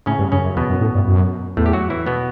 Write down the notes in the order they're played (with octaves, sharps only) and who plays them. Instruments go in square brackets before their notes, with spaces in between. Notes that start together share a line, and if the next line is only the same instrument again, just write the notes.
[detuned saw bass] A2 [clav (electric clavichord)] C#3 C#4
[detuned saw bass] G2
[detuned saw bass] F#2 [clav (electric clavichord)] C#3 C#4
[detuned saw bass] F#2
[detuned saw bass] E2 [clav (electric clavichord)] B2 B3
[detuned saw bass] F#2
A2
G2
F#2
[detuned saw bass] E2 [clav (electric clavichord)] A2 A3
[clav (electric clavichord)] G4
F#3 F#4
E3 E4
B2 B3